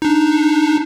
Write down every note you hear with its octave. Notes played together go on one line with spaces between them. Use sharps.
D4 D#4